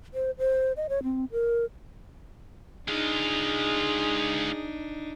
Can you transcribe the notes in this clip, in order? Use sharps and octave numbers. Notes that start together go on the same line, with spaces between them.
C5
C5
D#5
C#5
C4
A#4
G#3 D4 D#4 F4 G#4